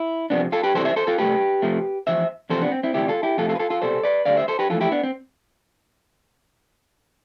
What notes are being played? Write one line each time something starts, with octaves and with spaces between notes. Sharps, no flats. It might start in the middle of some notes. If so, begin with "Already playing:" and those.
Already playing: E4
C2 C3 F3 B3 D4
F4 A4
G4 B4
E2 C3 E3 G3 A4 C5
C5 E5
A4 C5
F4 A4
C2 B2 A3 G4 B4
F2 C3 F3 A3
E2 C3 F3 C5 E5
E2 C3 F3 A4 C5
B3 D4
C4
C4 E4
D2 C3 E3 G3 E4 G4
F4 A4
E4 G4
F2 C3 F3 A3 F4 A4
F4 A4
B4
F4 A4
F4 A4
C2 B2 G3 A4 C5
B4 D5
D2 D3 G3 D5 F5
C5 E5
A4 C5
G4 B4
F2 E3 A3 F4 A4
E4 G4
B3 D4
C4